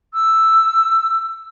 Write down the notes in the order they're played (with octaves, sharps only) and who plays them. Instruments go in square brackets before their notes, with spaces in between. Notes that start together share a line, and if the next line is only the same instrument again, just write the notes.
[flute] E6